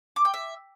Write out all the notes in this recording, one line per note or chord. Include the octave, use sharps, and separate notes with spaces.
D6
G5
E5